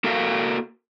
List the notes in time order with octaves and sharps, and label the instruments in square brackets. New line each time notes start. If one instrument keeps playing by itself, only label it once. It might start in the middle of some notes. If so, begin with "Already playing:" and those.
[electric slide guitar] A#3 F#4 A4 A#4 E5 F5